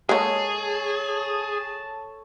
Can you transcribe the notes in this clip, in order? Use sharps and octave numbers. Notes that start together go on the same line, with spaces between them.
G#3 A#3 D#4 G#4 A4 C#5 A5